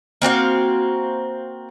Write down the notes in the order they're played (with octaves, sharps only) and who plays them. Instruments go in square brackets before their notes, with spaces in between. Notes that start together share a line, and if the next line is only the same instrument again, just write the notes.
[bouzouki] A#3 C4 F#4 F5